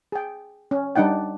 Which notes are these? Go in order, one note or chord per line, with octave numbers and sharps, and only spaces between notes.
G#4 G5
C#4
G3 D4 D#4 F#5 G5